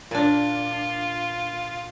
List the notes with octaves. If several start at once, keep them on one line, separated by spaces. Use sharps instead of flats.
A#2 D4 F4